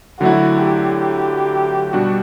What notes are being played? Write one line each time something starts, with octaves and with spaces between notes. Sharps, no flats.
D3 F#3 A3 E4 F#4
G4
B2 G3 D4 F#4